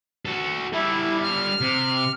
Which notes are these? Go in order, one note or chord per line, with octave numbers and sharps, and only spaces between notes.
F#4 A4
G3 E4 A4
F6
C3